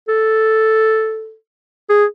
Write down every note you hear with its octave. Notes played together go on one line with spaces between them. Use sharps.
A4
G#4